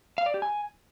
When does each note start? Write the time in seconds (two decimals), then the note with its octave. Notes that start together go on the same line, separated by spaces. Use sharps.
0.18 F5
0.26 D5
0.34 G4
0.42 G#5